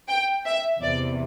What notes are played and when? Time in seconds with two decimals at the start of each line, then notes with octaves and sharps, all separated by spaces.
0.08 G5
0.46 E5
0.82 E2 C3 E3 D5